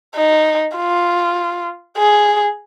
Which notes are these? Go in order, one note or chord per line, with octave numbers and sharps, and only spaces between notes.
D#4
F4
G#4